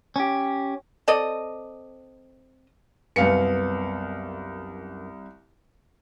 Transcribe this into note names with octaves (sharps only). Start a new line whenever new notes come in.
C#4 G4
C4 A4 D5 D#5
C2 F#2 B3 B4 F5 C#7